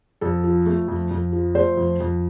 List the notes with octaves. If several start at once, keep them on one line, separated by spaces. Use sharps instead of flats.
F2 A4
F3
A3
F2
F2
F3
A3 C5
F2
F2